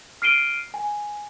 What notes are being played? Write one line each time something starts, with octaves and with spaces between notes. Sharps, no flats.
F6 C7 D7 D#7 G7
G#5